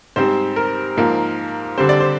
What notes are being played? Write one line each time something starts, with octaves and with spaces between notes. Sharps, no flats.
G#2 G3 C4 C5
A#4
G#2 F3 A#3
D3 G3 C4 C5
D5
C5